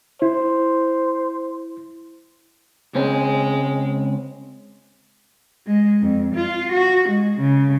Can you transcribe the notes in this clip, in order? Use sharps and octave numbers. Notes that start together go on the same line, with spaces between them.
E4 C5
C#2 G#3 C4 C#4
G#3
F2
F4
F#4
G#3
C#3